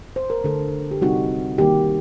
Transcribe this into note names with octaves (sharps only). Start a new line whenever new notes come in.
C5
A#4
D3 A3 D4 A4
G4
C3 G3 C4 D#4 F#4
D#3 G3 A#3 G4